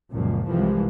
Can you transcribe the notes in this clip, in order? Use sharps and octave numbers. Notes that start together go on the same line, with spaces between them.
C#2 F#2 A#2 F3
C2 E3 F3 G3 G#3